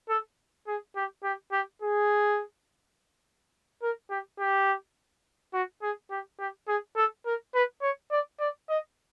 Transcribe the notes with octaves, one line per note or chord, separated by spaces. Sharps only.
A4
G#4
G4
G4
G4
G#4
A#4
G4
G4
F#4
G#4
G4
G4
G#4
A4
A#4
B4
C#5
D5
D5
D#5